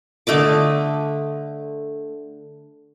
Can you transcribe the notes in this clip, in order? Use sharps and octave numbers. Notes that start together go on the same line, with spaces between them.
D3 A3 D#5 D6